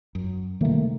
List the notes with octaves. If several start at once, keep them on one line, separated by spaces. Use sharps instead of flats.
F#2
C3 D#3 G3 A3 A#3